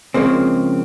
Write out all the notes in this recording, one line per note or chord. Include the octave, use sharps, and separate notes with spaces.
C#3 F3 G#3 A#3 C4